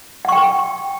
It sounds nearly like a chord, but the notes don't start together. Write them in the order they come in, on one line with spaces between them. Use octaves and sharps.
F#5 C#6 G5